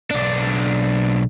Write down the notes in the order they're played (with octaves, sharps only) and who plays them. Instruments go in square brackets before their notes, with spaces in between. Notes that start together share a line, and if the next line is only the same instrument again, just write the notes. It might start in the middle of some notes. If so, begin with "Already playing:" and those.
[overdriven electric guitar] B1 D4